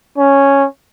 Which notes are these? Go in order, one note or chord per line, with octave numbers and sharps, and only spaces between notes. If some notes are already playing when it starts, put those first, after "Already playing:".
C#4